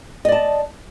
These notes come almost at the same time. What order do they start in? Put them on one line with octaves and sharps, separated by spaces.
D#5 D5 A5